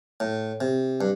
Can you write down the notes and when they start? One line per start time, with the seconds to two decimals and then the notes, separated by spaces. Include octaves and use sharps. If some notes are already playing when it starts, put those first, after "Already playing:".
0.20 A2
0.61 C3
1.01 G2